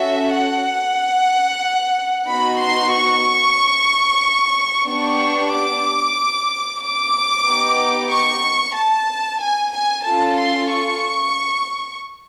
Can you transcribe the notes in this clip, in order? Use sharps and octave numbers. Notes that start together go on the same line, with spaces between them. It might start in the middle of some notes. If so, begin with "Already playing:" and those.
Already playing: C#4 F#4 A4 E5
F#5
B3 D#4 F#4 B5
C6
C#6
B3 D4 G4 C#6
D6
D6
B3 D#4 G4
C#6
A5
G#5
G#5
C#4 F4 A4 A5
C6
C#6